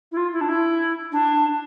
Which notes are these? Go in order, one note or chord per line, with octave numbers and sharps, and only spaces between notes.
E4
F4
E4
D4
E4
D4